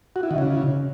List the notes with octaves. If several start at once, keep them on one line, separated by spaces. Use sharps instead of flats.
F#4
E4
D#3
C#3